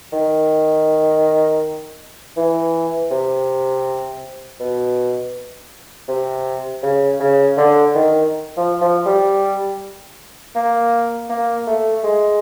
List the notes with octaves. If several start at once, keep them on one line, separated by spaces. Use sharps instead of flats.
D#3
E3
C3
B2
C3
C#3
C#3
D3
D#3
F3
F3
G3
A#3
A#3
A3
G#3